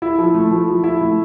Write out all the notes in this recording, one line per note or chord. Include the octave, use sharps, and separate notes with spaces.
E4
F3
A3
F3
F3
E4
A3